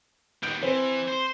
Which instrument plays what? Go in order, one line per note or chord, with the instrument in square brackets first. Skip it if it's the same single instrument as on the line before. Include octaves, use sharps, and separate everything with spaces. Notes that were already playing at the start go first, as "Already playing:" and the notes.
[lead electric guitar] D#3 B3 [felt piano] G6 D7
[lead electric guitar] E3 [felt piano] C4
[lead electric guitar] C5